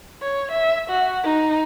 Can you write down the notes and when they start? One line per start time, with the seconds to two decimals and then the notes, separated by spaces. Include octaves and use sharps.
0.22 C#5
0.51 E5
0.90 F#4
1.24 D#4